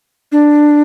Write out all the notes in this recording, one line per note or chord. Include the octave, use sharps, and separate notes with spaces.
D4